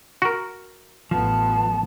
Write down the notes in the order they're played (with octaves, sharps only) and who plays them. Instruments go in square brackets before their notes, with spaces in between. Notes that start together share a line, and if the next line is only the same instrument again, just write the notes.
[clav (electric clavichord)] F#4 A#4
[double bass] A1 B3 [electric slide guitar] F3 [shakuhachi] A5